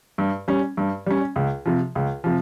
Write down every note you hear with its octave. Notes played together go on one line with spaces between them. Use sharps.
G2
G3 C#4
G2
G3 C#4
C#2
C3 F3
C#2
C3 F3